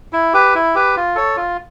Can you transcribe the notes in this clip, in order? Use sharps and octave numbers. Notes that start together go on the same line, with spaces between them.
E4
G4 B4
E4
G4 B4
F4
A4 C#5
F4